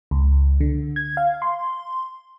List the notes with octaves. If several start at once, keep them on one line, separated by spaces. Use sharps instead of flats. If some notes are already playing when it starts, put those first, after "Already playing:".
C#2
D3
G#6
F5
C6